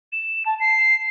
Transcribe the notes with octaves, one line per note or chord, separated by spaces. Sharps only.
E7
A5
C7